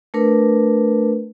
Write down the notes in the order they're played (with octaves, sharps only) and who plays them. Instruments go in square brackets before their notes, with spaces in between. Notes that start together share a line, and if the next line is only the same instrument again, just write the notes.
[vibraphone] A3 D4 A#4 B4